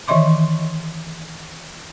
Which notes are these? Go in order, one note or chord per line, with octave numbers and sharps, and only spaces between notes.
D#3 E3 D#5 E5 C6 D6